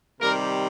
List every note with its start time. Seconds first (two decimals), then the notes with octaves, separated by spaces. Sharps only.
0.21 C3 D#3 G3 A#4